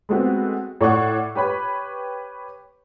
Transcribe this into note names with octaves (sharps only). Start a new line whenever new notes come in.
G#3 A3 B3 C4 F#4
A2 C#5 D5 F#5 C#6
G4 B4 C#5 B5